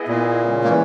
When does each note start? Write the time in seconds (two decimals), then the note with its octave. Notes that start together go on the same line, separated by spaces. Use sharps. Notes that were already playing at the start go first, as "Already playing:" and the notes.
Already playing: B3 E4 G#4 D#5
0.08 A#2
0.38 C#3 G#3 C#4
0.64 A#3
0.69 E3